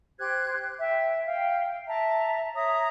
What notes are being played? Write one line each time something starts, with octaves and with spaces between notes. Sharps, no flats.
G4 C5 F#6 G#6
E5 G5
F5 G5
E5 A5 A#5
C#5 E5 A#5 D#6